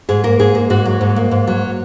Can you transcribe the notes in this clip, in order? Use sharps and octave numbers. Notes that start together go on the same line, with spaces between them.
G#2 G#4
A#3 A#4
G#2 G#4
A#3
G#2 F#4
F#3
G#2
A#3
G#2
F#3